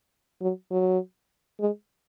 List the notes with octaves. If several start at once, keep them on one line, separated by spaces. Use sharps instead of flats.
F#3
F#3
G#3